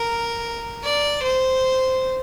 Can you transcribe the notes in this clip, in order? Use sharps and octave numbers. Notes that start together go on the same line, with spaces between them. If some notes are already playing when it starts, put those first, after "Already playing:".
Already playing: A#4
D5
C5